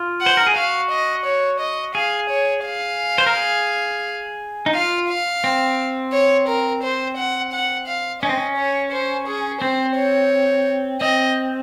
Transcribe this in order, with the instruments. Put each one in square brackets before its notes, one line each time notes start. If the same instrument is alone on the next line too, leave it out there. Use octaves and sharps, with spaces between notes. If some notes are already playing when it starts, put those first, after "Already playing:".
Already playing: [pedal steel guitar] F4
[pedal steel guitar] C5 [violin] F#5
[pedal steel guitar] A#4
G#4
[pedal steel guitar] F#4 [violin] F5
[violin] D#5
C#5
D#5
[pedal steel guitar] G#4 [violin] F5
[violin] C#5
F5
[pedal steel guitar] C5
A#4
G#4
D#4
[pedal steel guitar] F4 [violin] F5
[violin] F5
[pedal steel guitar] C4
[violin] C#5
A#4
C5
F#5
F#5
F5
[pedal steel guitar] C#4 [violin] D#5
[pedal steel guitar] C4
C#4
[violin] C#5
C5
G#4
[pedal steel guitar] C4 [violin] C5
[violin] C#5
[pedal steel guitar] C4 [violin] D#5